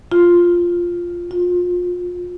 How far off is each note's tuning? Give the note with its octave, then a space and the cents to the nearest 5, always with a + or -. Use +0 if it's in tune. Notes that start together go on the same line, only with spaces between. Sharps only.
F4 +0
F4 +30